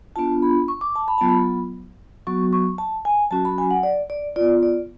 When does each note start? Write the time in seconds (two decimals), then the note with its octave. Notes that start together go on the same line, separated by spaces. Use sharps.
0.16 B3 D4 F4 A5
0.42 B5
0.68 C#6
0.81 D6
0.96 A5
1.08 B5
1.18 F#3 B3 F4 A5
1.29 B5
2.27 F#3 B3 F#4 C#6
2.53 C#6
2.78 A5
3.05 G#5
3.31 F#3 C#4 F#4 A5
3.45 B5
3.58 G#5
3.71 F#5
3.83 D5
4.10 D5
4.36 F4 D5
4.41 B3
4.63 D5